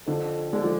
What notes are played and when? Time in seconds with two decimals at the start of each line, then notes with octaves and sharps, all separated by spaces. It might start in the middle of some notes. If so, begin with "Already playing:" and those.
0.07 F2 D3
0.53 D3 G#3
0.64 F3